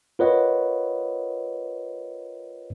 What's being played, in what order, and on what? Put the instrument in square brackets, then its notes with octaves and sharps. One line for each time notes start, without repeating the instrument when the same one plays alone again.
[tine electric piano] F4 A#4 B4 C#5 D#5 F#5